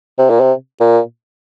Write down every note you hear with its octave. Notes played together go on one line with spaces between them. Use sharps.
C3
A#2
C3
A#2